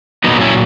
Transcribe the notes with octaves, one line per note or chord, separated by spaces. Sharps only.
A#2 F#3 B3 D#4
C#4 E4